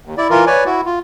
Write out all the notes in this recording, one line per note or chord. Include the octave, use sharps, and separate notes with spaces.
D#2
E4 D5
E3 F4 A#4
B4 C#5 D5 G#5
E4 F#4
F4